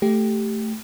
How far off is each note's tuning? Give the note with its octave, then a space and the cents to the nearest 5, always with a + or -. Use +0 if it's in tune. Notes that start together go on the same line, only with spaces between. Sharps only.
A3 +0 G4 +0